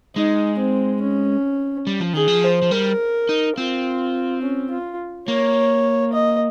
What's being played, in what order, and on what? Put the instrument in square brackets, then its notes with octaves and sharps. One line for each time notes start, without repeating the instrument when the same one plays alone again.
[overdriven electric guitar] G#3 [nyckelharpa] D#4
[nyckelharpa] C4
C#4
[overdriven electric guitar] G3
F3
[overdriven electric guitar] D#3 [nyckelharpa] G#4
[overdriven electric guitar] F3
[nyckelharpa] C5
[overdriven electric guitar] F3
[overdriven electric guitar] G3 [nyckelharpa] A#4
[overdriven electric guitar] D#4
[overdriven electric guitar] C4 [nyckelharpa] F4
[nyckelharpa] C#4
F4
[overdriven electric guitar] A#3 [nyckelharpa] C#5
[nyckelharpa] D#5